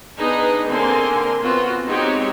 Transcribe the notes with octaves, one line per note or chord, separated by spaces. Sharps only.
B3 D4 D#4 G#4 B4
D3 A#3 C4 G#5 C6
B3 C4 F4 F#4
G#3 C4 D#4 F#4 G4 C#5